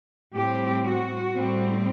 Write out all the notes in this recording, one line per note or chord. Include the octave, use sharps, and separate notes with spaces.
A2 G3 C4 G4
F#4
A2 G3 C4